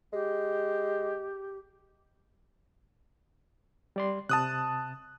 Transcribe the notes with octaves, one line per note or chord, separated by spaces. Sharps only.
G#3 G4
G3 D5 C6
C3 A5 D#6 F#6